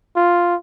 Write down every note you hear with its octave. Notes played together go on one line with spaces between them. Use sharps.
F4